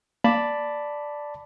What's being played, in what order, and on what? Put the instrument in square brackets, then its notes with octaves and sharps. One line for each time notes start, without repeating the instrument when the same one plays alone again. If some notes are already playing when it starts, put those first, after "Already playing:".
[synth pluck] A#3 [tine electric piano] D5 A5 B5